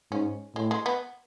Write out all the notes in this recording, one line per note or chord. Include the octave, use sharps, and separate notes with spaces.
G#2 C#4
A2 G#3
G#3
B3